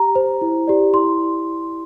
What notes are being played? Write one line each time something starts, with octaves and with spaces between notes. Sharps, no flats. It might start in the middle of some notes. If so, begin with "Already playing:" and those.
Already playing: G4 A#5
C5
E4
G4 D5
E4 C6